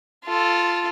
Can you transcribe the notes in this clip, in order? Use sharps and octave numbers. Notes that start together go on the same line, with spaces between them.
F4 A4